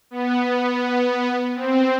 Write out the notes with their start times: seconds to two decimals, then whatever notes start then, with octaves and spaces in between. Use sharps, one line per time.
0.11 B3
1.55 C4